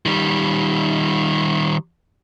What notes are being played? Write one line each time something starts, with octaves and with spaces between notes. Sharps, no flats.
D#3 G3